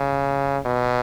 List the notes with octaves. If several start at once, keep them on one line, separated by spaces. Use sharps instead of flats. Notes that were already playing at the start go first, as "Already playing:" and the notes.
Already playing: C#3
B2